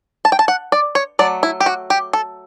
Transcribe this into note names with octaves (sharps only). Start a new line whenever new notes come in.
A5
G5
A5
F#5
D5
C#5
F#3 A3 D5
E4
G4
F#4
G4
A4